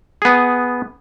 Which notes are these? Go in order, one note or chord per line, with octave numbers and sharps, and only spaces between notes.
B3 G#4